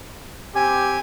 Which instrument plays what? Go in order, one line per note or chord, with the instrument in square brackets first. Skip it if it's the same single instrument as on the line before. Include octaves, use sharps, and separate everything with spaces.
[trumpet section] C4 G4 [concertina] G#5